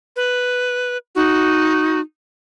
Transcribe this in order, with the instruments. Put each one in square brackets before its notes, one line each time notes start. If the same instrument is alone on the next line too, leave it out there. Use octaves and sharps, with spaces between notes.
[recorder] B4
[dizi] D#4 [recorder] F#4